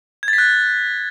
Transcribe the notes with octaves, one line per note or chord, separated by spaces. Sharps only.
G#6
A6
B6
F#6